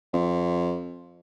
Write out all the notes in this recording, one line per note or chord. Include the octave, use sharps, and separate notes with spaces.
F2